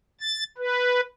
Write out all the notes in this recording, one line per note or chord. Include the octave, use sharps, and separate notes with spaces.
A6
B4